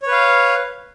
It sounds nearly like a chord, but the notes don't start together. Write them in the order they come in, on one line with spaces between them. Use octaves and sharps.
C#5 B4 F5